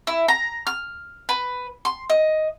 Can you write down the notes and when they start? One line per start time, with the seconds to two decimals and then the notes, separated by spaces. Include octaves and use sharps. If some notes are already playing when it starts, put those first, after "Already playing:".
0.07 E4
0.28 A#5
0.67 F6
1.29 B4
1.85 C6
2.10 D#5